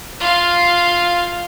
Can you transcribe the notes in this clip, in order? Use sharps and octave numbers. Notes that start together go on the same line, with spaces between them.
F4 F5